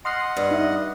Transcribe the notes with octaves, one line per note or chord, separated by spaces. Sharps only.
D#5 F#5 C6 F6 C7
G2
D#4 E5